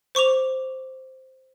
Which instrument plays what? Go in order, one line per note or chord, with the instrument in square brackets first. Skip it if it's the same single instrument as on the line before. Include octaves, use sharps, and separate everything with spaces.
[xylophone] C5 C#6 D6 F7